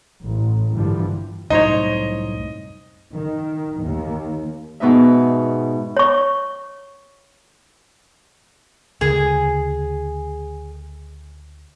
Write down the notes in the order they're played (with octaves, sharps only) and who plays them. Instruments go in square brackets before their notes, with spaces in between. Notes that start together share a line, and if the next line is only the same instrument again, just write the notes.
[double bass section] A1
G2 A#2 D3 E3 F3 G3
[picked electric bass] C2 F#2 A2 [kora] D#4 C5 C#5 [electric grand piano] D#5
[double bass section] D#3
D#2
[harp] G#2 B2 B3 D#4 E5
[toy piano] C#5 C#6
[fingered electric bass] D2 C#3 [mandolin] G#4